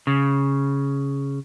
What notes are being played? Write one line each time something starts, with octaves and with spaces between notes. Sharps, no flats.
C#3